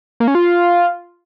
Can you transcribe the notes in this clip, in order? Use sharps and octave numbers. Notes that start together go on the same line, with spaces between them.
A#3
C#4
F4